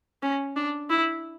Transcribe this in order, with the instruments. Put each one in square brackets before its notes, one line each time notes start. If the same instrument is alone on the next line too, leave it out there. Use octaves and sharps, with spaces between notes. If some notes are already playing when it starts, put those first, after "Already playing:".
[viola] C#4
D4
E4